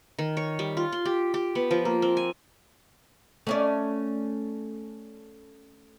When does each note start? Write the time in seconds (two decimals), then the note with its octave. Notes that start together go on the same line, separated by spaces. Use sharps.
0.19 D#3
0.37 C#5
0.59 G3
0.77 F4
0.92 C6
1.05 G4
1.34 G4
1.55 B3
1.71 F3
1.85 A#3
2.02 C4
2.17 G#5
3.47 A3 C#4 D5